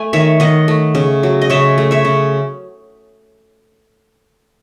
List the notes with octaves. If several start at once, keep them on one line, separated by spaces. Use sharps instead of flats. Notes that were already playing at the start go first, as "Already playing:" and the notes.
Already playing: A3 G#5
D#3 C#5 E5
D#3 D#5 F#5
A3
C#3
F#3
D#5
C#3 C#5 E5
A3
C#5 E5
C#3